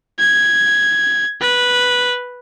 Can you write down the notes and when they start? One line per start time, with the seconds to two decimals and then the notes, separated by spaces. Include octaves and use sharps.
0.19 G#6
1.41 B4